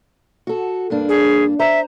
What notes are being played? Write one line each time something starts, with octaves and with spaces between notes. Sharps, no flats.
F#4 A4
G2 A#3 D4
G#4
C5 E5 A#5